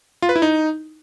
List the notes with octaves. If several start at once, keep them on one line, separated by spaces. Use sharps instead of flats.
F4
B4
E4
D#4